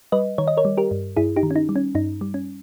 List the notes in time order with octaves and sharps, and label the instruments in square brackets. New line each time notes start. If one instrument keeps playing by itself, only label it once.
[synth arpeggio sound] G3 B4 D#5
D#3 C#5
D#5
A#4 C#5
G3
G4 A#4
G2
G2 E4 G#4
D#4 G4
D#3
C#4
D#4
G3
C#4
G2 D#4
G3
C#4